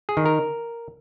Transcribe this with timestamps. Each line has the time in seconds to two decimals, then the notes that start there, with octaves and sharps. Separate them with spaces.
0.09 G#4
0.17 D#3
0.26 A#4